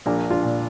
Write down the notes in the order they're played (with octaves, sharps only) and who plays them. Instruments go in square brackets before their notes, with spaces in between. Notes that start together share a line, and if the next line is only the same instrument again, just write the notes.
[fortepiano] A#1 A#3 D4
D4 F4
A#2